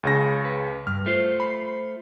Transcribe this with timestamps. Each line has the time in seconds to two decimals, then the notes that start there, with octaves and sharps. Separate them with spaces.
0.03 C#2 C#3 A#6
0.45 B4
0.87 G2 F6
1.06 A3 F4 C5
1.40 B5 C7